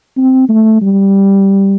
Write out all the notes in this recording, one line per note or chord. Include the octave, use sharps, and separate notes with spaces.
C4
A3
G3